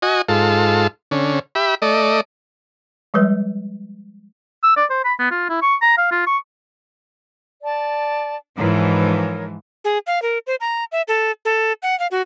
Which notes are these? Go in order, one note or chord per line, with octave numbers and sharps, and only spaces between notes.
F#4 D#5 G#5
G#2 F4 A4
D3 C#4
G4 E5 B5
A3 D5 D#5
F3 G3 G#3 B4
E6
D5
C5
B5
B3
F4
E4
C#6
A#5
F5
F4
C#6
D5 A5
G#2 E3 F3 A#4 C#5
G#4
F5
A#4
C5
A#5
E5
A4
A4
F#5
F5
F#4